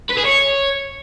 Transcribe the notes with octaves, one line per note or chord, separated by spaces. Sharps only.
B4
G#4
C#5